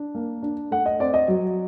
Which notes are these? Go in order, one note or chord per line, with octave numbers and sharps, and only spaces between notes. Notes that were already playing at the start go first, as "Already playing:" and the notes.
Already playing: D4
A#3
D4
A3 F#5
D#5
C4 D5
D#5
F#3